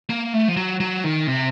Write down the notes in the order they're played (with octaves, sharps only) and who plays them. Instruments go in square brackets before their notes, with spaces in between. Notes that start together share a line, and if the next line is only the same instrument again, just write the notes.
[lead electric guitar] A#3
A3
F3
F#3
F#3
D#3
C3